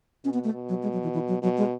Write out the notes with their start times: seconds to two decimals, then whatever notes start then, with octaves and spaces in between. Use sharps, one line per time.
0.25 B2 C#4
0.34 B3
0.44 A3
0.53 B2
0.69 F#3
0.83 G#3
0.93 F#3
1.03 E3
1.14 E3
1.28 F#3
1.43 B2 F#3
1.58 G#3